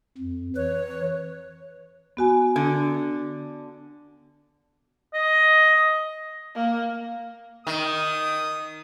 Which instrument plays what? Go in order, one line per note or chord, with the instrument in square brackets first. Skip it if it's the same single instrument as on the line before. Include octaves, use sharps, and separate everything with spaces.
[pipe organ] F2
[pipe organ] E3 B4 [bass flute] C#5
[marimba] B3 F#4 G#5
[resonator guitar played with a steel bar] D3
[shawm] D#5
[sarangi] A#3
[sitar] D#3 [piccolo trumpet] D#6